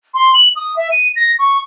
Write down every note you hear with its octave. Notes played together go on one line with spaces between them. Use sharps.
C6
F#7
D#6
E5
D#7
A#6
C#6